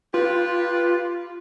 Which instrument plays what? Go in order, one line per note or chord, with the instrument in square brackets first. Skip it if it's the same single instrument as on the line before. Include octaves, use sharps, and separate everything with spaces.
[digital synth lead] F4 [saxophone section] G4 B4